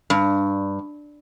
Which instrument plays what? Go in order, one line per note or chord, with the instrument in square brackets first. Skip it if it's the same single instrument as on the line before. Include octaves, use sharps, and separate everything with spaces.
[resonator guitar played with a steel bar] G2